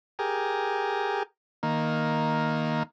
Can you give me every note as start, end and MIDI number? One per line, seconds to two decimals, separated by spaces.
0.19 1.23 67
0.19 1.23 68
0.19 1.23 70
1.63 2.83 51
1.63 2.83 58